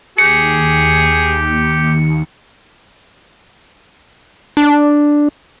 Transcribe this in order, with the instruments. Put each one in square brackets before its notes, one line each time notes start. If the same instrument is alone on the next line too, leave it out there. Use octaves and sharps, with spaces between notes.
[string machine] D#2 [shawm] G4 [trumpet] G#4 [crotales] C#7
[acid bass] D4